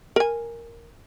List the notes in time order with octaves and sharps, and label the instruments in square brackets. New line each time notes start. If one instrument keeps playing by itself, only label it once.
[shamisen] A#4 G#5